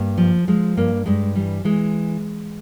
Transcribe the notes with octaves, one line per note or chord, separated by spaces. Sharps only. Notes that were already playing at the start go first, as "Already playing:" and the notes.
Already playing: G2 A#3
F3
F3 G#3
G2 A#3
G2 G#3
E3 G3
E3 G#3